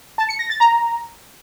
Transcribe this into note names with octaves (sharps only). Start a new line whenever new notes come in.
A5
C#7
A#6
A6
A#5